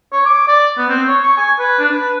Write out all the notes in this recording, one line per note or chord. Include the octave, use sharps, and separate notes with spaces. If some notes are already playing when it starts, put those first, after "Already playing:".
C#5
D6
D5
B3
C4
C#5
C#6
G#5
B4
D4
B4